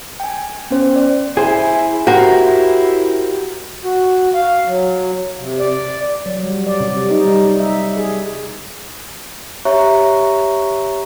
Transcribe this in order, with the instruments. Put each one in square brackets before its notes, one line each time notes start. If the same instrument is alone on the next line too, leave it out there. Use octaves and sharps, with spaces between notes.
[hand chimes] G5 G#5
B3 C#4 C5
D5
[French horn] E4 [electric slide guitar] G#4 C5 G#5
[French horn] E4 [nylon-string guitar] F#4 [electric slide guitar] G4 A#4 C5
[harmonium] F#4
F5
F#3
C3
D5
[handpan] F#3
G3
D5
C3
D#4
G3
D#4
E5
G#4
[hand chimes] G4 C#5 E5 A#5 C#6 F#6